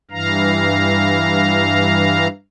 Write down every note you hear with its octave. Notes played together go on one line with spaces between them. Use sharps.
G2 E3 F5 A#5